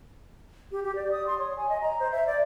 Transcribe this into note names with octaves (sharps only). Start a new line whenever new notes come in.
G4
G4
D5
D#6
C6
C#5
G#5
D#5
A#5
C5
E5
D5